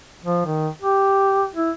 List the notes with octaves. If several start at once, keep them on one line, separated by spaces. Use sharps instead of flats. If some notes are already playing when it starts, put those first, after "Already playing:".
F3
D#3
G4
E4